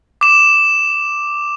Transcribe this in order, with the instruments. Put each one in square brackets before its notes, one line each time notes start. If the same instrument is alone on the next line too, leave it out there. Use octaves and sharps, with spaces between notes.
[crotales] D6 E7